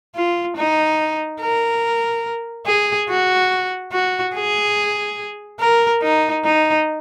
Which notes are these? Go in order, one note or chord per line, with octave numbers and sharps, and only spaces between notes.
F4
D#4
A#4
G#4
F#4
F#4
G#4
A#4
D#4
D#4